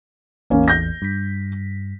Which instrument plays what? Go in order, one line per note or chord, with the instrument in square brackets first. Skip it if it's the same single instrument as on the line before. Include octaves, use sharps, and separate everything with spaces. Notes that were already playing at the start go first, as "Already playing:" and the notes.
[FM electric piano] A1 E2 [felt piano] A#3 C#4
[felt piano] G6 A#6
[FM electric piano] G2 B6